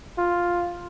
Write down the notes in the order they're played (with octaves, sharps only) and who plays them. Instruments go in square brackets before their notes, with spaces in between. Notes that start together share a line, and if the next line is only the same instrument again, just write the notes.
[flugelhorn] F4